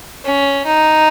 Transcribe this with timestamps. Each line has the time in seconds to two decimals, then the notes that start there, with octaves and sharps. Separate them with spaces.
0.25 C#4
0.66 D#4